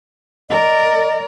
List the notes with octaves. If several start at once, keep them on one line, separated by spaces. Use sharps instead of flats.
A#4 D5 D#5